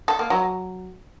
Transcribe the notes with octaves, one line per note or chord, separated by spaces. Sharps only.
A4
A#3
F#3